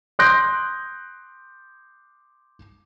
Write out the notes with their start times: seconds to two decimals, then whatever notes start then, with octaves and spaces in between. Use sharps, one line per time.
0.19 C6 D#6 F#6 G6 A#6 D7